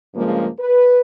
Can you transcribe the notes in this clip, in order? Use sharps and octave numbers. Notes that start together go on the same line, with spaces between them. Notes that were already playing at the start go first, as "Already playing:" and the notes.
G2 C#3 F3 G#3 A#3
B4